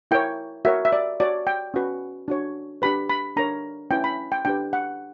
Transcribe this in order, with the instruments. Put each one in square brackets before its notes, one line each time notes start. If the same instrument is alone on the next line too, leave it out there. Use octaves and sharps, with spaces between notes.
[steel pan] E4 A#4 C#5 G5
F#4 A#4 C#5 E5
E5
D5
F#4 C#5 D5
G5
C#4 F#4 B4
D4 F#4 C#5
D4 G4 B4 B5
B5
D4 A#4 C#5 A#5
C#4 E4 B4 G5
B5
G5
D4 G4 B4 G5
F#5